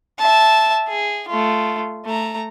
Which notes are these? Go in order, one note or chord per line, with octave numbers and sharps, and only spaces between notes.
E5 A5
G#4
A3 F4
A3 A#5